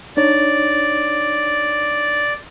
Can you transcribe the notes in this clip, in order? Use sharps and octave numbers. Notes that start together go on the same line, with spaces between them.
D4 D#4 C#5 D5